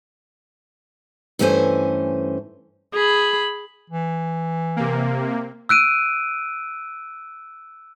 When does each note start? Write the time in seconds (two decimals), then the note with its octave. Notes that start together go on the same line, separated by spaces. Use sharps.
1.39 G2 E3 A3 C#4 C5 G#5
2.94 G#4 B5
3.90 E3
4.76 C3 A#3
5.69 E6 F#6 D7 D#7